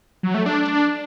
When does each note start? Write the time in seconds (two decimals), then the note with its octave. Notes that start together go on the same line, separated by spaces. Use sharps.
0.23 F#3
0.35 A3
0.46 D4